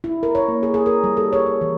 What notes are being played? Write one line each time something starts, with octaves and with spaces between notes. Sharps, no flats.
E4
A#4
C#5
A#3
G#4
G#4
A#4
G3
A4
C#5
G#4
E3